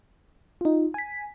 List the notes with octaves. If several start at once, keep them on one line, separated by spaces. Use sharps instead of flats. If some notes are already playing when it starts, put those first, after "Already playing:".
D#4 F4
G#5 B6